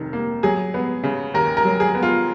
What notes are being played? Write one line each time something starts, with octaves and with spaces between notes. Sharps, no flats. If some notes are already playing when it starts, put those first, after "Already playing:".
Already playing: F1 D#3
A#3
F#3 G#4
B3
C#3
D#2 A#4
A#4
F#3
G#4
B3
F4